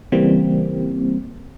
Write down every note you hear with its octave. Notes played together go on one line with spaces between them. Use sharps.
C#3 E3 G3 A#3 C4